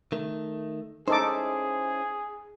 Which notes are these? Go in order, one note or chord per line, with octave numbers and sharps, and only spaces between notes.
D#3 A3
C#4 D#4 E4 G#4 A4 C5 D6